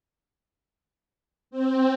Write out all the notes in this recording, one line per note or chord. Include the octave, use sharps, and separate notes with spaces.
C4